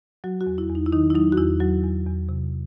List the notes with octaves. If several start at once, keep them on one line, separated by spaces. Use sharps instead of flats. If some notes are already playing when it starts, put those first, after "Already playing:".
F#3 F#4
F#4
E2
E4
E2
D#4
E4
D#3 D#4
E4
F#3 D#4
F#4
E2 E4
F#3 F#4
E2
E2
C3